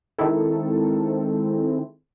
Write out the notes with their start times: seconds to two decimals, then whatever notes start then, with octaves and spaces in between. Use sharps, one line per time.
0.18 D#3 G#3 C4 E4 A4